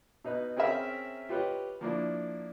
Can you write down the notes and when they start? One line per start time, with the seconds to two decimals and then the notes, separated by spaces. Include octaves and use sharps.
0.24 B2 D#4 B4
0.56 C4 C#4 G#4 A#4 E5
1.29 F4 G4 B4 C#5 D#5
1.81 F3 A#3 D4 E4